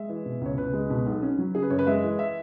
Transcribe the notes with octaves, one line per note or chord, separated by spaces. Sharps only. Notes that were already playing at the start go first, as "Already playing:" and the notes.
Already playing: G#3 E5
E3
B2
C#2 C#5
C#2 B4
G#3
B2
B1
C#4
F#3
C#3 G#4
B4
F#2 C#5
B4
G#3 E5
E3
E5